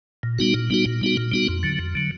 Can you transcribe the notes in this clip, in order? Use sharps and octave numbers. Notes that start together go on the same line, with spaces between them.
A#2
G3 B3 D#4 F#4
A#2
G3 B3 D#4 F#4
A#2
G3 B3 D#4 F#4
A#2
G3 B3 D#4 F#4
F2
D3 F#3
F2
D3 F#3